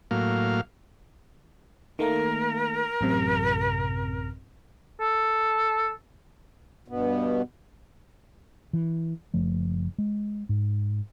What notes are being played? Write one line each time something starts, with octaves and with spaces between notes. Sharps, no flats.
A2 F#3 A#3 F5
D#3 A3 A#3 A#4
A1 F#2 C3
A4
G2 B2 B3
E3
F#1 F3 A3
G#3
G#2